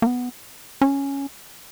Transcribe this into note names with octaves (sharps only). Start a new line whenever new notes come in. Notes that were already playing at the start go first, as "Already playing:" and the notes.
A#3
B3
C#4